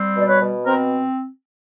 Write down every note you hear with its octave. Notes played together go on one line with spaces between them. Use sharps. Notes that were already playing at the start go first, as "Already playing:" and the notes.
Already playing: G3 C4
B2 D5
B4 C#5
B2
C4 A#4 C5